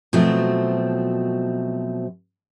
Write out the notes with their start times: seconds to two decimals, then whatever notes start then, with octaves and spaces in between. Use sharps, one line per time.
0.13 B2 F3 F#3 A3 C4